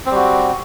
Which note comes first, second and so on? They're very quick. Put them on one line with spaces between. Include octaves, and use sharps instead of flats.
C4 G3 F#4